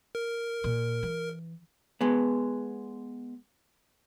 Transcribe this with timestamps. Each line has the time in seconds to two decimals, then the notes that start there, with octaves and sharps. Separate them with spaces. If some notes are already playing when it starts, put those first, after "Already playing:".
0.15 A#4
0.64 A#2
1.03 E3
2.01 G#3 B3